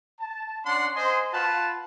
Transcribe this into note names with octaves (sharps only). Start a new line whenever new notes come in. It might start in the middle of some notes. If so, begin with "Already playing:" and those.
A5
C#4 D4 F#5 C6
C5 D#5 G#5 C6
F4 B4 F#5 A5